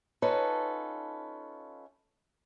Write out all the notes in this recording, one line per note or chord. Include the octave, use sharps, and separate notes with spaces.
C#4 D#4 F4 A4 B4